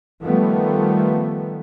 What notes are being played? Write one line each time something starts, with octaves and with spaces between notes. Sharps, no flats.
D#3 F3 G3 A3 B3